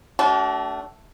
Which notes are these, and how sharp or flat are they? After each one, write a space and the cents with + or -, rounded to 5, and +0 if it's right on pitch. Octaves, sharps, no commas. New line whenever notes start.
A3 +0 D4 -35 F#4 +40